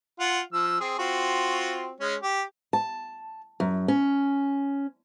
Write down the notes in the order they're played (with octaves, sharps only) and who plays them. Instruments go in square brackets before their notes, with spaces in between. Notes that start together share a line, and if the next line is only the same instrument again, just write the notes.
[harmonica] F4 F#5
F3 E6
C4 G#4
C4 F4 F#4
G#3 C#4
G4
[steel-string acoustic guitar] A5
F#2
C#4